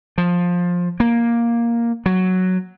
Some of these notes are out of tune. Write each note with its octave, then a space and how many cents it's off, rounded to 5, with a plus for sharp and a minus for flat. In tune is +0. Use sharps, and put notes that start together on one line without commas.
F3 +15
A#3 +5
F#3 +0